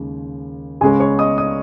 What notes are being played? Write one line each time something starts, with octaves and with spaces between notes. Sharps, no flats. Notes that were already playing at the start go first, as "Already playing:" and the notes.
Already playing: D#2 C#3 G#3
C#2 C#3 G#3 C#4 G#4 G#5
C#5 C#6
D#5 D#6
D#5 D#6